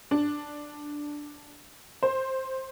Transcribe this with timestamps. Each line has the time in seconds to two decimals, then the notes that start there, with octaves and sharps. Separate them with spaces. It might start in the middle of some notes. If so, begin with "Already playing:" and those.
0.11 D4
2.03 C5